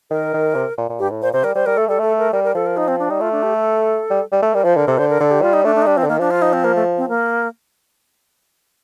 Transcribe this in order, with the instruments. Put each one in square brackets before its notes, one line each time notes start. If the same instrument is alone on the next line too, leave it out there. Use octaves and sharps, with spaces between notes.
[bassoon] D#3 [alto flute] A#4
[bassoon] D#3
C3
A#2
A#2
[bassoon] G2 [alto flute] G4
[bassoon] A2
[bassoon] A#2 [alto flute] C5
[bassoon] C3 [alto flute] C5
[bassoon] G3 [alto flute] A#4
[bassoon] G3 [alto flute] C5
[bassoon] G3 [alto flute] A#4
[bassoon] A3 [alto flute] A4
[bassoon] G3 [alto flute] A4
[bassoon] A3 [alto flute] A4
[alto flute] A#4
[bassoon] G3 [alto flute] A#4
[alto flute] A#4
[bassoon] F3 [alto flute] A4
[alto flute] A#4
D#4
C4
D4
[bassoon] G3 [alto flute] D#4
[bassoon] A3 [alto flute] F4
[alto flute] D4
G4
A4
[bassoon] G3
G3
A3
[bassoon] G3 [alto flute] A#4
[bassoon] F3 [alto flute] C5
[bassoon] D3 [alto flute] A#4
[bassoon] C3 [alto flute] A4
[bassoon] D3 [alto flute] C5
[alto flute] A#4
[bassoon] D3 [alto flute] A4
[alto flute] G4
[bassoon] G3 [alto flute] F4
[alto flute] D#4
[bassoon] A3 [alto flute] D4
[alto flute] D4
D#4
[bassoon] G3 [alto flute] D4
[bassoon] F3 [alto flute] C4
[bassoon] D3
[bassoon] D#3 [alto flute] A#3
[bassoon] F3 [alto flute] D4
[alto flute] F4
D#4
C4
A#3
A3
C4
A#3